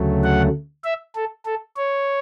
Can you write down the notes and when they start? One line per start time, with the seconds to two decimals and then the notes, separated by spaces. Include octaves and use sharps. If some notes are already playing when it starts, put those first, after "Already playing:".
Already playing: D2 C#3 F#3 A3
0.23 F#5
0.84 E5
1.15 A4
1.46 A4
1.76 C#5